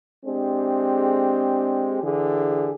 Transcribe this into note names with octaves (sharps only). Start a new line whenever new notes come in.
G#3 C4 D4 G4 G#4
D3 E3 G4 G#4